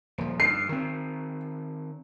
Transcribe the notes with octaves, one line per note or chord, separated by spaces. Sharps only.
D#1 F3
G2 C7
D#3 C4